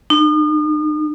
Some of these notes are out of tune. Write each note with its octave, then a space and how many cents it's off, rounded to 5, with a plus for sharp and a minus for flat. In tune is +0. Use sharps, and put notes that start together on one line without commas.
D#4 -40